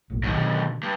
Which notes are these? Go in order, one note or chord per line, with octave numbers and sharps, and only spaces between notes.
F#1 B1 A2
F#2 D#3
B2 D3
G2